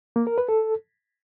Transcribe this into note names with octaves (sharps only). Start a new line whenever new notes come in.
A#3
A#4
B4
A4